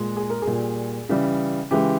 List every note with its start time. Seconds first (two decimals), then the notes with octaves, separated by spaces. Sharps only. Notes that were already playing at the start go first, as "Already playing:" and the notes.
Already playing: A#2 G#3
0.17 G#4
0.30 A#4
0.42 G#4
0.47 A#2 G3
1.09 C#3 E3 G3
1.71 C#3 E3 G#3 G4